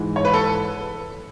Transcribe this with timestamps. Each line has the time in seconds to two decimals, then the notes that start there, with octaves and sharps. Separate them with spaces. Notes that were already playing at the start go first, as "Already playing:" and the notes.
Already playing: G#2 E3 G#3
0.16 C#5
0.25 B4
0.34 A4